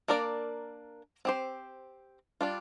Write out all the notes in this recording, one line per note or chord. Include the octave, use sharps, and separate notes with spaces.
A#3 D4 A#4 D5
C4 G4 C5
G3 D4 F4